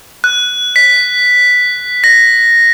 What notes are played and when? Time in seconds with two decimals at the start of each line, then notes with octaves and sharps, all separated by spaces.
0.24 F#6
0.76 B6
2.04 A#6